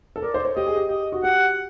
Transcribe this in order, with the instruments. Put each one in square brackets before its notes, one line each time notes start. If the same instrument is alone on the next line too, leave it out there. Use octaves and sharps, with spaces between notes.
[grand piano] A4
[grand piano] A#4 [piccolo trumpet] D5
[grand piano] C5
C#5
[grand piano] G4 [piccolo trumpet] D#5
[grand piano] G#4
G4
[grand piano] G4 [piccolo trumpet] D#5
[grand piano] F#4
[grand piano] G4 [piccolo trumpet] F#5